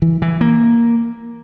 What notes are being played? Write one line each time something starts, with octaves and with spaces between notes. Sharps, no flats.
E3
E3
A#3